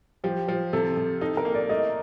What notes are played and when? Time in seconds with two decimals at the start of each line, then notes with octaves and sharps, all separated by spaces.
0.24 F3 G4
0.48 F3
0.73 C3 A4
0.97 C3
1.21 D#4 A4
1.37 A#4
1.45 A#3
1.54 D5
1.69 A3 D#5